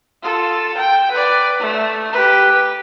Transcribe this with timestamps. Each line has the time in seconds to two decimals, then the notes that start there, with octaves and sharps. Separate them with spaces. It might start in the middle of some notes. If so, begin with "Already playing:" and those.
0.23 F4 A4
0.77 G5
1.11 B4 D5
1.60 A3
2.13 G4 B4